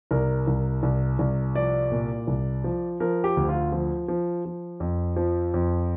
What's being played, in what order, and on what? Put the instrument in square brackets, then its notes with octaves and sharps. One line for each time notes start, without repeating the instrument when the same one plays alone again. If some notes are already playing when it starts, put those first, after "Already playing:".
[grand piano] C2 A#4
C2
C2
C2
F3 D5
A#2
C2
F3
F3 A#4
G4
D2
F4
F3
F3
F3
F2
F3
F2